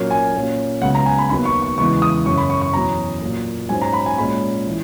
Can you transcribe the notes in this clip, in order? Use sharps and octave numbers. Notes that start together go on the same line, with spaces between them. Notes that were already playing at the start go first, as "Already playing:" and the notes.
Already playing: A#2 F#3 A#3 C#4
G#5
A#2 A#3 C#4
C#2 C#3 F#3 B3 F#5
A#5
G#5
B5
D#2 D#3 F#3 B3 B5
C#6
C#6
E2 C#3 E3 G#3 B3 C#6
D#6
F#2 C#3 F#3 C#4 C#6
B5
C#6
C#6
E2 B2 F#3 C#4 A#5
A#2 F#3 A#3
G#2 F#3 C#4 G#5
A#5
B5
G#5
A#2 G#3 C#4 B5
E3